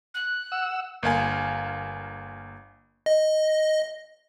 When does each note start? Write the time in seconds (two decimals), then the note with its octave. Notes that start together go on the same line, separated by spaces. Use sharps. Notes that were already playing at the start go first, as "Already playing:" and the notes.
0.14 F#6
0.52 F#5 E6
1.03 G1 A#3 F5 G#5
3.06 D#5